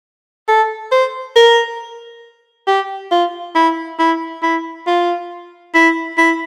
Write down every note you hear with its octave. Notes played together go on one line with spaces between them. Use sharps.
A4
C5
A#4
G4
F4
E4
E4
E4
F4
E4
E4